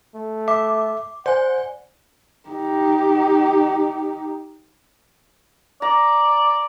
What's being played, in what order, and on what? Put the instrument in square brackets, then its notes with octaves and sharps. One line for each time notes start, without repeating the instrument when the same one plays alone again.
[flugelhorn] A3
[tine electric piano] E5 [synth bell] D6
[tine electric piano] C5 [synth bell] D5 G#5 [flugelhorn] F#5
[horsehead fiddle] D#4 G4
[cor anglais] D5 [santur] A#5